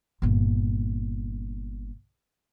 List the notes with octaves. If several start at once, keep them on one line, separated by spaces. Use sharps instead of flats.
G1 A#2